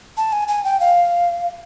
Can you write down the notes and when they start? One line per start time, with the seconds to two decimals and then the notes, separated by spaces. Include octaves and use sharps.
0.17 A5
0.32 G#5
0.48 G#5
0.64 G5
0.80 F5